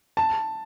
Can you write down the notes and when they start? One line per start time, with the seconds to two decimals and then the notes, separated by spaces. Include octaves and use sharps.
0.17 A5